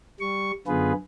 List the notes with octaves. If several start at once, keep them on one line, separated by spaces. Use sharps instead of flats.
G3 C#6
F#2 D3 B3 F4 G#4 B4